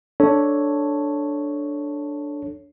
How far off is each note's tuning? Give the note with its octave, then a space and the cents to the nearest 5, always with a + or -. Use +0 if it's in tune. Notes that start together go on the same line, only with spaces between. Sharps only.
D4 +0 A4 +0 C#5 +0